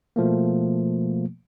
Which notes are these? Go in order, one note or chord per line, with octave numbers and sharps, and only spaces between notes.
B2 F3 A3 A#3